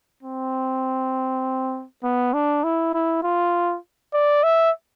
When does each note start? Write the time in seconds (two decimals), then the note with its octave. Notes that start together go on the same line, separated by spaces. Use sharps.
0.23 C4
2.04 B3
2.34 D4
2.64 E4
2.94 E4
3.23 F4
4.14 D5
4.44 E5